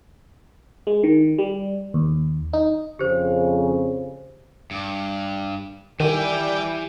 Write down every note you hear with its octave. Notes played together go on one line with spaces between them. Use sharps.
G#3
D#3
G3
D#2
D#4
F2 C#3 G4 C5
G2
D#3 E3 G3 G4 G5 G#5